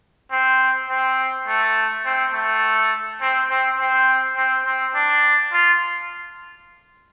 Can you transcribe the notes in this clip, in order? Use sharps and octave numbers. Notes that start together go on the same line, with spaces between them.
C4
C4
A3
C4
A3
C4
C4
C4
C4
C4
D4
F4